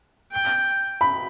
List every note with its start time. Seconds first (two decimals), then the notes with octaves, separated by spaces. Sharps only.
0.32 G5
1.01 B5